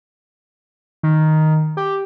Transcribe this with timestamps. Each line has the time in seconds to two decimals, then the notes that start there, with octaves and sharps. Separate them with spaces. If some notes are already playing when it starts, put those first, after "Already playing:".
1.03 D#3
1.77 G4